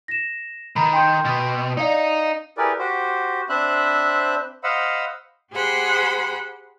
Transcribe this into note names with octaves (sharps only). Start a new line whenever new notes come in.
A#6 E7
D#3 A#5 B5
G5 C6 G6
B2
D#4 D5 D#5 F5
E4 G4 G#4 A#4 B4 D5
F#4 G4 C5
C4 D4 C5 E5 B5 F#6
C5 D#5 F5 F#5 B5 E6
G4 G#4 C5 F#5 B5 C6